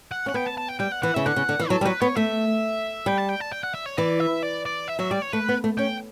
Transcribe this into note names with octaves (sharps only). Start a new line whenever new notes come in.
F#5
C#4 F#5
B3 G5
A5
A5
G5
G3 G5
F#5
E3 F#5
C#3 E5
D3 F#5
C#3
D3
E3
F#3 A4
G3
F#3 B4
B3 C#5
A3 E5
G3 G5
A5
G5
A5
G5
F#5
E5
C#5
E3 D5
E5
D5
D5
E5
F#3 E5
G3 D5
C#5
A3 B4
B3
A3
C#4 G5